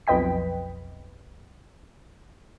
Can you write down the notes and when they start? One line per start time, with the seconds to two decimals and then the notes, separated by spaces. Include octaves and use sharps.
0.07 B1 F2 B4 D#5 G5 B6